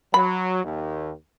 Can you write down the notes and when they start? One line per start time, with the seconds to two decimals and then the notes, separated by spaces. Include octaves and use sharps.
0.14 F#3 B5
0.64 D#2